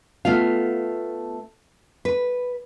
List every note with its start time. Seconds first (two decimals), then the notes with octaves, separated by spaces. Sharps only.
0.25 A3 B3 F4 F5
2.05 B4